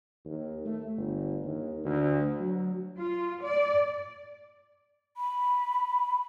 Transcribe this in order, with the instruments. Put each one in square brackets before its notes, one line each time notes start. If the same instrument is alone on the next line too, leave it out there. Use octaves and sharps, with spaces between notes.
[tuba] D#2
A3
G1
D#2
D2
F#3
[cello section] F4
D5
[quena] B5